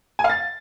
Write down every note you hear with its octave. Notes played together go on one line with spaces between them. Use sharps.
G#5
F5
A6